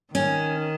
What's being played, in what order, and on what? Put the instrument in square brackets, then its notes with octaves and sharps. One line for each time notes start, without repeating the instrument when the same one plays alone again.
[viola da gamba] D#3 [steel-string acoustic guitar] C#4